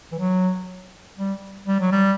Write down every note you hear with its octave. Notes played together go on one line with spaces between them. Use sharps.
E3
F#3
G3
G3
F#3
G3